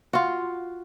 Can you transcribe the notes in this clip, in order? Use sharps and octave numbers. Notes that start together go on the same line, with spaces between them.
F4 F#4